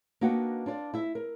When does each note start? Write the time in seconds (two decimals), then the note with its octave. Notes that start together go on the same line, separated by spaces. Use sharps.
0.21 A#3 D4 D#4 F#4 B4 G5
0.66 D4 F4 D5
0.94 E4 E5
1.15 A#4